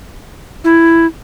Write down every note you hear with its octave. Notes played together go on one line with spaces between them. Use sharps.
E4